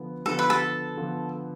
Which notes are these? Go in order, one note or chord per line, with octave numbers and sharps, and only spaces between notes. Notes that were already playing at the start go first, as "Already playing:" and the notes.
Already playing: D3 F3 B3
D3 F3 B3 A4
B4
A4
D3 F3 B3